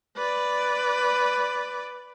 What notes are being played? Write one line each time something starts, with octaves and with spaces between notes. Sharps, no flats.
B4 D5